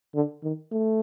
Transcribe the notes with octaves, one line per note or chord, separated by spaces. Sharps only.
D3
D#3
A3